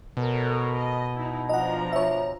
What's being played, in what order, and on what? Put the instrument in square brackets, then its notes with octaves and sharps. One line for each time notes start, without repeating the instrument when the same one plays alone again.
[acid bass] B2 [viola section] A4 A#4 C#5
[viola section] D#5
D#4 E4
[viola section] F3 D4 A#5 [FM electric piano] D#5 F#5
[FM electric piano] C#5 E5